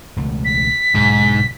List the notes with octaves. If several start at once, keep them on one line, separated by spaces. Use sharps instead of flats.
E1 C#2 A3
B6
B1 G#2 D3